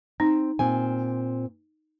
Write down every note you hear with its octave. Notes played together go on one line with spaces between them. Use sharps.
C4 D#4
A#2 C4 G#5